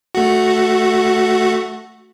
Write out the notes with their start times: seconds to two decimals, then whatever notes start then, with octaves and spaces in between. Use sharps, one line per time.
0.15 A3 F#4